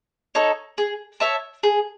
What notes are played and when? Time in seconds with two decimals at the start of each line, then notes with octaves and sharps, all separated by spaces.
0.35 D#4 A4 C#5
0.78 G#4
1.20 C#5 E5 A5
1.63 G#4